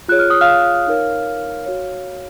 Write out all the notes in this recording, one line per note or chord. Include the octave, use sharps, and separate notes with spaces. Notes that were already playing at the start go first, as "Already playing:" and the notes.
F4 G#4 C#5 F#6
F6
D#6
F5 F6
D#4 A#4 C#5
F#4 C#5